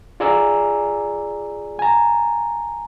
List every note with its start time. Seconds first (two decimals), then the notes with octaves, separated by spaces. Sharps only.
0.20 F4 G#4 D5 G#5 A#5 E6
1.79 G#5 A#5